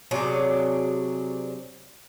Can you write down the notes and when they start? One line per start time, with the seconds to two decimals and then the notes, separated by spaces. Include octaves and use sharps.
0.11 C3 F#3 D4 G#4